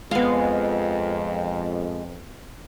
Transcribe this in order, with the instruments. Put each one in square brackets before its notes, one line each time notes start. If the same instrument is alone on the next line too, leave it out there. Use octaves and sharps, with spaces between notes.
[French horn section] F2 [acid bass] G#3 [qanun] B3 F5